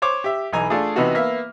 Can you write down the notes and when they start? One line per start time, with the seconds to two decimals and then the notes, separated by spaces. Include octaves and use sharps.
0.02 C5 C#5 D6
0.24 G4 E5
0.53 B1 E3 D#4 G#5 A#5
0.70 A3 D4 F4 G#4
0.96 C3 E3 B3 D#4 F#4
1.15 A#3 B3 E5